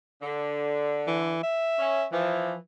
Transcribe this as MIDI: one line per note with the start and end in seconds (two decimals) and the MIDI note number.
0.22 1.33 50
1.07 1.39 52
1.43 2.05 76
1.79 2.03 61
2.12 2.53 52
2.12 2.57 53